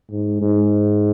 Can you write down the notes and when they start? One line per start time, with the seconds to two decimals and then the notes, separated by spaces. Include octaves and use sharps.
0.10 G#2
0.42 G#2